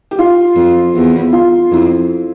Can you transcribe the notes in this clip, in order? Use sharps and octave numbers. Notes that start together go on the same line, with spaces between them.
G4
F4
F2
E2
F4
F2 E4